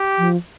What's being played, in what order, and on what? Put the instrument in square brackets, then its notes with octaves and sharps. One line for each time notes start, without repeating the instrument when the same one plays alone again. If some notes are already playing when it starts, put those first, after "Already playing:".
Already playing: [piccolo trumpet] G4
[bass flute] F3